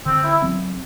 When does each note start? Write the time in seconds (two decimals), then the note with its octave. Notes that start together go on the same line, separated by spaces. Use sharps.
0.06 D3 C4
0.24 E4
0.42 F#3 C4